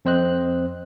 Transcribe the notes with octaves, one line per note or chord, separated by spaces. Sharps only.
F2 C4 C5 D#5 F#6